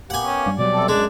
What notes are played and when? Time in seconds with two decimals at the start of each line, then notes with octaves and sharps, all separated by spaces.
0.10 A#3 B3 G4 F#5 G#5
0.25 C#4
0.46 G2 G3
0.58 B2 F#3 G3 D5
0.72 C3 C4 A4
0.88 F#2 G#3 D4